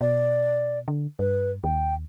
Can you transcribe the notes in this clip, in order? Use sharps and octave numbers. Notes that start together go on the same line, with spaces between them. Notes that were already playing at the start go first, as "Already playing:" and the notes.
B2 D5
D3
G2 B4
D#2 G5